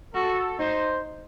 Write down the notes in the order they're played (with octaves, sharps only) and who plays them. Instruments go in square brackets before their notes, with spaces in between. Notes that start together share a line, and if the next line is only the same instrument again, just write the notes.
[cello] F#4 [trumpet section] A4
[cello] D#4 [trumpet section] C5